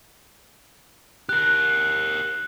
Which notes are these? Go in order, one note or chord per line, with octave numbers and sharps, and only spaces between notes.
G4 A#4 F#6